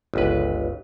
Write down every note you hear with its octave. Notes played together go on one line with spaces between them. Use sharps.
G1 C#2 B4